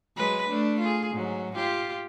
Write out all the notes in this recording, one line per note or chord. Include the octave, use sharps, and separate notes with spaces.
F#3 G#3 B4
A3 D4
F4 G#4
G#2 F#3
F4 G4